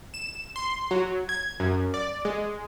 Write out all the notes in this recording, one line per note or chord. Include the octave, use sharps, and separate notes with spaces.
E7
C6
F#3
G#6
F#2
D5
G#3